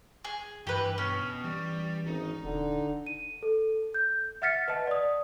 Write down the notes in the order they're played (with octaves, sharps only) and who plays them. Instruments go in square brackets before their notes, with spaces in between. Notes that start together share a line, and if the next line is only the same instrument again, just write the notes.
[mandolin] G#4
[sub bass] G2 [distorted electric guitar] E3 [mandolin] G4 B4
[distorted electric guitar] B2 B5 [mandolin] C#4
[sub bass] E3 [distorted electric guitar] G3
[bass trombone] G#1 [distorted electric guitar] D#4
[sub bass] D#1 [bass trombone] D3
[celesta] D#7
A4
G6
E5 F#5 F6 A6 B6 C#7
B4 D#5 F#5 A5
D5 D#6